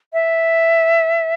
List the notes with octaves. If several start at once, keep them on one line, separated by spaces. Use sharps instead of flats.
E5